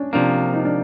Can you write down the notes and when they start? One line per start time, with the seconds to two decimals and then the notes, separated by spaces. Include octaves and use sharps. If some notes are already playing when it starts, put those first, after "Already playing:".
Already playing: C#4 D4
0.13 C3 F3 A#3 D4
0.54 D#4
0.65 D4